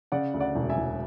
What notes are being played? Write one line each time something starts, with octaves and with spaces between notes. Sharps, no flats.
C#3 D5 F#5
D2
D5 F#5
E1
E5 G#5
E1